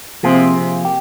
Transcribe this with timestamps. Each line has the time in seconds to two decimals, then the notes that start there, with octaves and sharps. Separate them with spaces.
0.23 C3 F3 A#3 F4 G#4
0.54 C3
0.85 G4